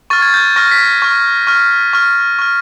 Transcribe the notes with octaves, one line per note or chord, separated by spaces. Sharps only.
C#6 F6 A6
G#6
G6
C#6 F6 A#6
B6
C#6 F6
C#6 F6
C#6 F6
C#6 F6